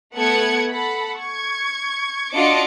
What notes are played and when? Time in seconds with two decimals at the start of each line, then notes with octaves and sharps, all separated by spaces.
0.16 A3 B3 A4 F#5 G#6 C#7
0.70 A4 F#5 B5
1.19 C#6 G#6
2.34 D4 F4 F#4 D#5 D6 C#7